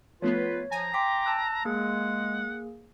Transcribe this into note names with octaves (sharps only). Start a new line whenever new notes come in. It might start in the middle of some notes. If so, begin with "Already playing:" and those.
F3 A3 B3 F4 B4 C#5
F3 G#5 A#5
G5 C6 D6 B6
A5 E6 F#6
G#3 A#3 G#4 F#5